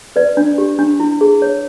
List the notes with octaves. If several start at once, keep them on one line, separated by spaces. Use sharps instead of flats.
B4 D5
D4
G4
D4
E4
G#4
C#5